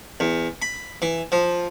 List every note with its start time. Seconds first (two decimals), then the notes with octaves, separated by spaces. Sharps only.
0.20 E2
0.62 B5
1.02 E3
1.32 F3